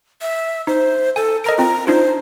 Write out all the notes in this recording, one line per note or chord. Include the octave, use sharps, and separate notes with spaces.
E5
D#4 C5
A4 G#5
A#4 D#5 A#5 D7
C4 F4 A#5
D4 D#4 F4 C5